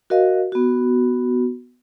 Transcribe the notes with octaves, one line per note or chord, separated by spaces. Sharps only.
F#4 A#4 D#5 F5
B3 F#4